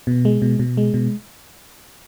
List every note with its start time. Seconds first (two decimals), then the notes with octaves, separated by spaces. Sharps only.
0.07 B2
0.25 G#3
0.42 B2
0.59 B2
0.77 G#3
0.94 B2